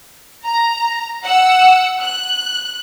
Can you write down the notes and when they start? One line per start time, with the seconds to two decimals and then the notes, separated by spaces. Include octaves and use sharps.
0.44 A#5
1.24 F#5 E6
2.00 F#6